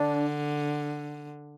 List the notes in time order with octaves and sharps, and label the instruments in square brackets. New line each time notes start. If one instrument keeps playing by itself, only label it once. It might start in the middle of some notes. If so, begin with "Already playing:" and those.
Already playing: [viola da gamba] D3 [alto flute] D4